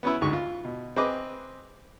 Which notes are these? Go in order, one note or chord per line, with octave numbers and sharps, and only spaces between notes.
B3 C#4 E4
D2 G#2 C#6
F4
B2
C4 G#4 B4 D#5 D6